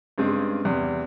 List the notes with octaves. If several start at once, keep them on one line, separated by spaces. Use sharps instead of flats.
G2 C#3 G#3 C4
E2 C3